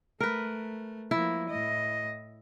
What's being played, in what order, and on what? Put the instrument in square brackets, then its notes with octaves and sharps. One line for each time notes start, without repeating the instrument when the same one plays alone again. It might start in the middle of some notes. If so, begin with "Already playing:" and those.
[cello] A3 [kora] A#4 B4
[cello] F3 A#3 [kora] E4
[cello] A2 D#5